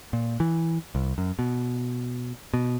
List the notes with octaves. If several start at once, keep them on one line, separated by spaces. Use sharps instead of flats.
A#2
E3
C2
F#2
B2
B2